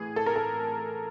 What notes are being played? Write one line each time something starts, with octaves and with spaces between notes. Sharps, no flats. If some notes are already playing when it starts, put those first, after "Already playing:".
Already playing: A2 E3 G#4
A4
A#4
A4